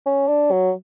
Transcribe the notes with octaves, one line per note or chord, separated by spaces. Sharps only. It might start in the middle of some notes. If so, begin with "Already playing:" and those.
C#4
D4
F#3